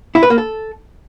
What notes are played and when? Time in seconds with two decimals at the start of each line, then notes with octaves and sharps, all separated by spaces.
0.15 E4
0.23 B4
0.30 A#3
0.38 A4